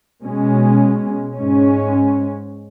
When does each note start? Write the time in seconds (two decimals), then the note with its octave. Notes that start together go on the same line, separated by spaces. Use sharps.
0.21 B2 G#3 C#4
1.33 G#2 G#3 C#4